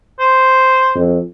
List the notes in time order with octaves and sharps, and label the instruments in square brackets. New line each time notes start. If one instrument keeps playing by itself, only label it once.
[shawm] C5
[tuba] F2